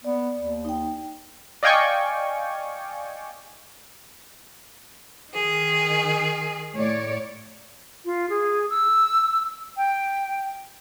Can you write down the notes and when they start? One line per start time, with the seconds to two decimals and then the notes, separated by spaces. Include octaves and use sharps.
0.04 B3 D5
0.37 D#2
0.65 D#4 G5
1.63 D5 D#5 F5 G5 G#5 C#6
5.32 D#3 G#4
6.75 A2 C#5 D5
8.05 F4
8.30 G#4
8.70 E6
9.77 G5